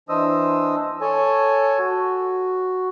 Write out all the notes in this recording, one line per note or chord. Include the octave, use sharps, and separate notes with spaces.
E3 D4 C5 D#5 D#6 E6
A4 C#5 G#5 A5
F#4